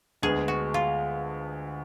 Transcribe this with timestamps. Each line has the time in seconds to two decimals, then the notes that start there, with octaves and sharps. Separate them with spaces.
0.23 D2 D3 G#3 B3 G#4
0.48 F#4
0.74 F4